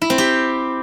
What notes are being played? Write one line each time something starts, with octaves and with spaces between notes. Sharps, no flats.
E4
C4
G4